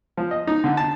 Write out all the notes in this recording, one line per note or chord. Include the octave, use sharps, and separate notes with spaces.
F3
D#5
D#4
D3
A5